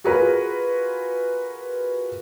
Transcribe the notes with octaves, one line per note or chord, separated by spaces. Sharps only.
F4 F#4 G#4 A#4 B4